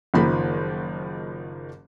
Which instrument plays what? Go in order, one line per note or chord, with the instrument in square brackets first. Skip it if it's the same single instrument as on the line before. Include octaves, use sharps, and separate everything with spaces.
[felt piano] F#1 D#3 F3 A#3 B5